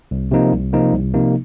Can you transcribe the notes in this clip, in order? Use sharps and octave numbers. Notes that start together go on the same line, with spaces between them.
C2
C3 F3 A#3 D#4
C2
C3 F3 A#3 D#4
C2
C3 F3 A#3 D#4